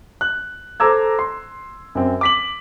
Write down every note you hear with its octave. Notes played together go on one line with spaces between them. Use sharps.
F#6
A4 C5 A#5 D6 E6 G#6
C6
F#2 C4
D6 B6 F#7